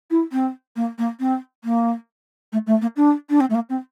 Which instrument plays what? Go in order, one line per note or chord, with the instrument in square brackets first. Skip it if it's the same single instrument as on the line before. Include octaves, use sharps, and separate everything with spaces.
[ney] E4
C4
A#3
A#3
C4
A#3
A3
A3
A#3
D4
D4
C4
A3
A#3
C4